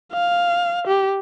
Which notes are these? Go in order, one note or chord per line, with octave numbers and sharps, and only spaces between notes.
F5
G4